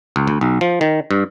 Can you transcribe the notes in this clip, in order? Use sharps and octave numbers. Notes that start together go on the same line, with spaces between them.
C#2
D2
B1
F3
D#3
G2